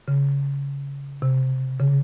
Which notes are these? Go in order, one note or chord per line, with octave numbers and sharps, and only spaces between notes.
C#3
C3
C#3